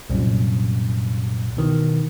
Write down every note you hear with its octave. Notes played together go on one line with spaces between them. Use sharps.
C2 F#2 A#2
B2 D#3 E3